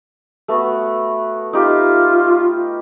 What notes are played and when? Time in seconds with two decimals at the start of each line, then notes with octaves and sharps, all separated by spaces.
0.48 A3 B3 F#4
1.53 D#4 F4 G4